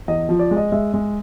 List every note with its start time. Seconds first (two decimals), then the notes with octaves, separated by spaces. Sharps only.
0.08 E2 D#5
0.29 F3
0.39 D5
0.51 G#3
0.57 D#5
0.72 G#3 E5
0.94 G#3